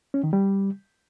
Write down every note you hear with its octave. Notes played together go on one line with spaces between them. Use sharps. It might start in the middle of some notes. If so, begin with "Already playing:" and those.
C#4
D#3
G3